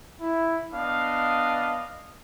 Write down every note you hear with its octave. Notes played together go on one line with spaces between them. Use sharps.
E4
B3 D4 D#5 F5